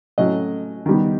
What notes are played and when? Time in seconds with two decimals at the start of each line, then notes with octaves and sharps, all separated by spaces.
0.18 A2 F#3 A3 C#4 D#5
0.86 D#3 G3 B3